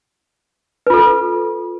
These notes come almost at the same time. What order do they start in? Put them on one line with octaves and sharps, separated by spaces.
B4 F4 A4